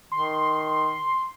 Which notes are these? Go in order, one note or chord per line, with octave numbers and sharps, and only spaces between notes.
D#3 C6